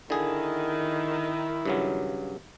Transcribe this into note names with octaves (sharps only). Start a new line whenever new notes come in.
D3 D#3 E4 G#4
G2 C#3 F#3